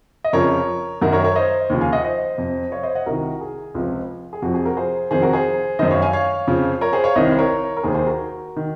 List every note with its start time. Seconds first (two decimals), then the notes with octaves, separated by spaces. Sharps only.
0.24 D#5
0.33 F2 C#3 F3 A#4 C#5
1.02 F#2 D#3 F#4 A#4
1.13 A#4 C#5
1.24 A#4 C#5
1.35 C5 D#5
1.70 D#2 C#3 F3
1.81 F5 G#5
1.93 D#5 F#5
2.04 C5 D#5
2.38 F2 C3 F3
2.72 C#5 F5
2.83 C5 D#5
2.95 D#5 F#5
3.06 C2 C3 D#3 F#4 A#4
3.41 G#4
3.75 C#2 C3 F3
4.33 G#4
4.42 F2 C3 F3 F#4
4.54 G#4
4.65 F#4 A#4
4.77 G#4 C5
5.11 F2 C3 D#3 G#4 C5
5.22 F#4 A#4
5.33 G#4 C5
5.79 F#2 D#3 C5 D#5
5.91 C#5 F5
6.02 F5 G#5
6.13 C#5 F5
6.47 F2 C#3 F3
6.81 A#4 C#5
6.93 G#4 C5
7.04 C#5 F5
7.15 C2 C3 D#3 C5 D#5
7.32 C5
7.39 A#4 C#5
7.77 A#4
7.84 D#2 D#3 G#4 C5
7.95 G#4 C5
8.06 F#4 A#4
8.56 D#3